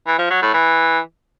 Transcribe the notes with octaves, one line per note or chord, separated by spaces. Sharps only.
E3
F3
F#3
A2
E3